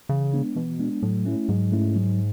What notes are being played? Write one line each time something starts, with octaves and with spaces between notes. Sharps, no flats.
C#3 E3
G#3 B3 D4
B2 E3
G#3 B3 D4
A2 F#3
A3 C#4 E4
G#2 F#3
A3 C#4 E4
F#3